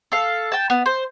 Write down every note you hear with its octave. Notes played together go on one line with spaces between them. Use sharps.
A4 F5
G5 A5
B3
C5